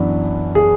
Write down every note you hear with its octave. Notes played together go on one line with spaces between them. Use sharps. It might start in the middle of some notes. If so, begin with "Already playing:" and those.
Already playing: F#2 E3 B3 D4
G#4